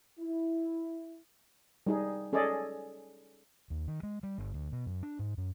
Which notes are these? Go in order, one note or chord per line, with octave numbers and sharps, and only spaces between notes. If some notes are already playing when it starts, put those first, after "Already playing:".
E4
G3 D#4 G#4
C#4 G#4 A4 D5 D#5
D#2
D#3
G#3
G3
G1
D2
B2
F#2
D4
G#2
F#2